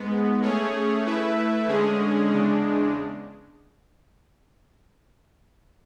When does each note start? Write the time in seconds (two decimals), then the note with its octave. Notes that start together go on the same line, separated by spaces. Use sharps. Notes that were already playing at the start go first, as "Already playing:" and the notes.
Already playing: G#2 G#3 B3
0.42 A3 C#4 G#4 C#5
1.05 A3 E4 B4 E5
1.68 D3 G#3 C#4 G#4
2.31 E2 C#3 G#3 D4